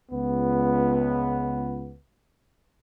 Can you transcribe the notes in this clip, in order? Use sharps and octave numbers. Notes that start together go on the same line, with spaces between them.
C#2 B3